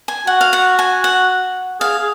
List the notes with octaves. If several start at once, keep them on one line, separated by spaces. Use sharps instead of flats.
G#5
F#4 F#5
F5
F#5
G#5
F#5
G#4 F5
G#4